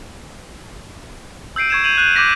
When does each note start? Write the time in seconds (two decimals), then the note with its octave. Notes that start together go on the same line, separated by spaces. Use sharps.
1.56 E6 G6 C7 D7 D#7
1.70 C#6 G#6 E7
1.84 G6 D#7 F7 F#7
1.98 F#6 G6 D#7
2.15 D6 G6 A#6 B6